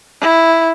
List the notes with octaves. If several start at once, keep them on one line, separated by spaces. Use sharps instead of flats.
E4